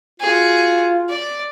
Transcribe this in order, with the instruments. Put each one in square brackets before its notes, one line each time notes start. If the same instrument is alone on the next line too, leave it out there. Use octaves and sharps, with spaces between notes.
[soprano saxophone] F4 [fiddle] F#4 G#4
[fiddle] D5